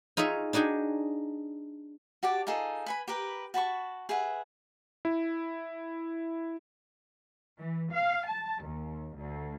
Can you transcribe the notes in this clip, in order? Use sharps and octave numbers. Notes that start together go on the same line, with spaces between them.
D#4 F4 G#4 C#5 E5
D4 D#4 F#4 G#4 G5
F#4 G4 D5 A5
D#4 F4 G#4 A4
B4 G#5 B5
G4 A#4 B4 B5
F#4 A5 B5 C#6
G#4 B4 E5 F#5
E4
E3
F5
A5
D#2
D2